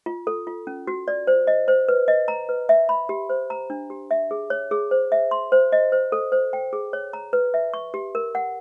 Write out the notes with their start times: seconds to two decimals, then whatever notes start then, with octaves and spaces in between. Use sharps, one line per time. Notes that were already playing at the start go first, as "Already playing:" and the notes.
0.06 F4
0.27 A4
0.47 F4
0.67 C#4
0.87 F#4
1.08 D5
1.27 C5
1.47 D#5
1.68 C5
1.89 B4
2.08 D#5
2.28 A#5
2.49 B4
2.69 E5
2.89 B5
3.09 G4
3.29 C5
3.50 A#5
3.70 D4
3.90 G4
4.11 E5
4.31 G#4
4.50 C#5
4.71 G#4
4.91 C5
5.12 E5
5.31 C6
5.52 C5
5.72 D#5
5.92 C5
6.12 A4
6.32 C5
6.53 G5
6.73 G#4
6.93 C#5
7.13 A#5
7.33 B4
7.54 E5
7.74 C#6
7.94 G4
8.15 A#4
8.35 F#5